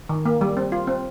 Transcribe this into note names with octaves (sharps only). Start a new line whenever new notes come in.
D#3
A#3
G3
C4
F4
C4